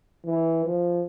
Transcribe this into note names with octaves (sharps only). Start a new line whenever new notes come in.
E3
F3